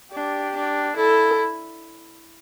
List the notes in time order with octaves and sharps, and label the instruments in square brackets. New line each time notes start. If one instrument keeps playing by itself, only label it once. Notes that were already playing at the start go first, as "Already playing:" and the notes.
[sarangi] D4 [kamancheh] G4
[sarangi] D4
[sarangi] E4 [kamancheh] A4